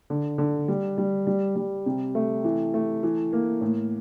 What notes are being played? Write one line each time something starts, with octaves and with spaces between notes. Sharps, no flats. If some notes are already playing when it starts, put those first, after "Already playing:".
D3
D3
G3
G3
G3
G3
C3
A3
E3
A3
E3
A#3
A2